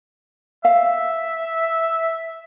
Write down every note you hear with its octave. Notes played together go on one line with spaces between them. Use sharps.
E5 F5